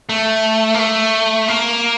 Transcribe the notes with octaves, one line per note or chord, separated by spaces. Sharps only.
A3
A#3
A3
A#3